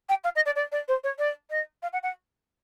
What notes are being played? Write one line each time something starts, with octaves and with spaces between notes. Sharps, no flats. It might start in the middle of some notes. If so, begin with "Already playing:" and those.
G5
F5
D#5
D5
D5
D5
C5
C#5
D5
D#5
F5
F#5
F#5